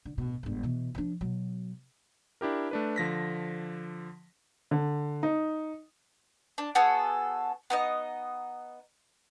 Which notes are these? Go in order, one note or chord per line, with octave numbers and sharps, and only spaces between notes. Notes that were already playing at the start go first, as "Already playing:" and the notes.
D3
D1 B2
G1 G#2
B2 E3
F3 D4
B2 F#3
D4 E4 G4 A#4
A3 D4 B4
D3 F3 A#6 B6
D3
D#4
D4
B3 F#4 G#4 A4
B3 D#4 D#5